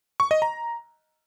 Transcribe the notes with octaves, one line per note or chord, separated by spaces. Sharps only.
C#6
D#5
A#5